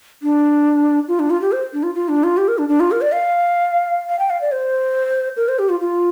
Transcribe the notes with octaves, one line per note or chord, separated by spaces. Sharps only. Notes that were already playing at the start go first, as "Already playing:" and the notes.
D4
F4
D4
F4
G4
C5
D4
F4
F4
D4
F4
G4
A#4
D4
D4
F4
A#4
D5
F5
F5
G5
F5
D5
C5
A#4
C5
G4
F4
F4